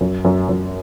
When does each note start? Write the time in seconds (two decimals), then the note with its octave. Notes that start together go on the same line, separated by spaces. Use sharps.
0.01 F#2
0.25 F#2
0.49 F#2